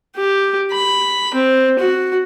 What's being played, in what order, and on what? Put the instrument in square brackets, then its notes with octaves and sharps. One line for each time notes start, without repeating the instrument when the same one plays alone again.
[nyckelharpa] G4
B5
C4
F#4